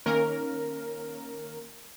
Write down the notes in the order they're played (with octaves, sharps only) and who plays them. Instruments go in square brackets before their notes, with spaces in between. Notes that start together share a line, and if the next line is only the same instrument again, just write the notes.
[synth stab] D#3 A#3 C#4 A#4